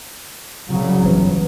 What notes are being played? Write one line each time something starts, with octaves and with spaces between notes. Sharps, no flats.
C2 C#3 F#3
G1 E3